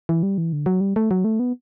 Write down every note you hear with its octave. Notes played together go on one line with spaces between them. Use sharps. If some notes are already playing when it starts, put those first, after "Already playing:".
E3
G3
E3
D3
F#3
G3
A3
F#3
A3
B3